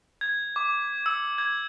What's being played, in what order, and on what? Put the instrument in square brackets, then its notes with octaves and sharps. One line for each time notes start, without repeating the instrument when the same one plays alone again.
[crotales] G#6
D6
E6
G#6